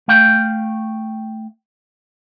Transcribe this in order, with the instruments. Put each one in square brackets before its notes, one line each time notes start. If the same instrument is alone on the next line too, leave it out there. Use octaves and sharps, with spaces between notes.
[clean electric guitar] A3 F5 G5